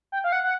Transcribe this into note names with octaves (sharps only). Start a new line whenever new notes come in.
G5
F5
F#5
F#5